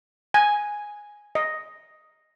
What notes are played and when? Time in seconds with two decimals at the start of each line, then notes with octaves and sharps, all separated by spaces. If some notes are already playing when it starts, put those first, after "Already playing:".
0.34 G#5
1.35 D#5